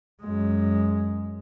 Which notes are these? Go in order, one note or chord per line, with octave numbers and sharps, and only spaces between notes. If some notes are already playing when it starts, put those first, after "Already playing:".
F#2 G#3